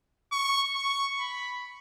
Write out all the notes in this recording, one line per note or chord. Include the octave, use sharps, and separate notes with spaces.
C#6
C#6
B5